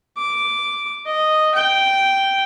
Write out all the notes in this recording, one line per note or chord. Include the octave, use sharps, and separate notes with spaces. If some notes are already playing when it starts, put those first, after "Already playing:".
D6
D#5
G5